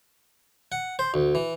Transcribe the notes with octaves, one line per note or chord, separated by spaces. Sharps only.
F#5
C5
D2
E3